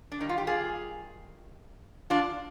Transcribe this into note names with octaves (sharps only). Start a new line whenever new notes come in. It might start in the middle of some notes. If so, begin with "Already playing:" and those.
D4
G2 D#3 G3 D#4
F4
G4
F4 G#4
D4 F4